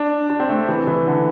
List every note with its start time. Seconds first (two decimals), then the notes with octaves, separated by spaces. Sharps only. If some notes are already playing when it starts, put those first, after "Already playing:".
Already playing: D4
0.30 D4
0.40 C4
0.49 A3
0.69 E3
0.87 E3
1.07 D3